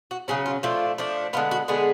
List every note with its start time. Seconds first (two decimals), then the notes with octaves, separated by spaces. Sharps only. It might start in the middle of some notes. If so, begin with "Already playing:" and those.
0.11 F#4
0.28 C#3 F#3 C#4 G#4
0.46 F4
0.63 F3 A3 D4 F4
0.98 F3 A3 D4
1.33 D3 G#3 B3 F4
1.51 F#4
1.68 D3 G#3 B3 G#4